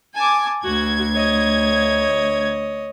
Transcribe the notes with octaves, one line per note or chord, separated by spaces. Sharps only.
G#5 A5 D6
D2 F#4 G#6
C#5 D#5